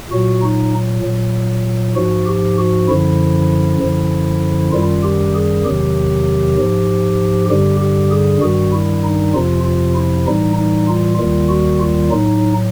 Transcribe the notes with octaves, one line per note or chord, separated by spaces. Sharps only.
A#2 F#3 F#4
D#4
A#2 F#3
G#2 F3 F#4
G4
F#4
F#2 D3 F3 E4
F#2 D3 F3
F#2 D#3 G3 F4
G4
G#4
E2 C3 D#3 F#3 G4
G#2 F3
G2 D3 G3 G4
G4
G#4
G2 D#3 G3 F#4
E4
D#4
F2 C3 F3 F4
F4
E4
A2 E3 G3 D#4
D#4
F4
D#2 D#3 G3 F4
F#4
F4
A2 F#3 D#4